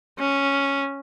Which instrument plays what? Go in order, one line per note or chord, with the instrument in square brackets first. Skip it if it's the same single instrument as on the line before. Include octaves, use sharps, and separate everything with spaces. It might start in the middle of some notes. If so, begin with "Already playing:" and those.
[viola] C#4